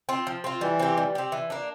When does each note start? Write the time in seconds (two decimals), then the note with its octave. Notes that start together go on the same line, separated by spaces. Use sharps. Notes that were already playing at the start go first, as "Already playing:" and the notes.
0.09 C4 F4
0.27 F3
0.44 C4 F4
0.61 E3 G3
0.79 C4 G4
0.97 G3
1.15 C4 G4
1.32 E3
1.50 A#3 D4